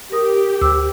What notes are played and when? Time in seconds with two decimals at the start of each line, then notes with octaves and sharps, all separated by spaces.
0.12 G4 A#4 D#6
0.61 D2 C5 D6 E6